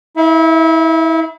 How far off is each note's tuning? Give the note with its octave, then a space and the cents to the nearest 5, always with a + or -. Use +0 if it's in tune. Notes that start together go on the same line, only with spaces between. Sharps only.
E4 -30 E5 +30